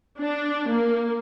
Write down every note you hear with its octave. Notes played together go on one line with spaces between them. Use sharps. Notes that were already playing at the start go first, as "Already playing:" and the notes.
D4
A#3